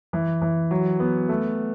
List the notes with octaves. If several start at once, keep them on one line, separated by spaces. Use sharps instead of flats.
E3
E3
F#3
B3
A3